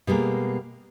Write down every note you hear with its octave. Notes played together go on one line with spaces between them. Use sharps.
B2 G3 G#3 A#3